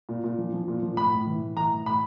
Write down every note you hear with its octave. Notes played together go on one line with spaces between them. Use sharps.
A#2
A#2
F3
F3
A#2
F3
A2 B5
A2
E3
A2
E3 A#5
A2
A2 B5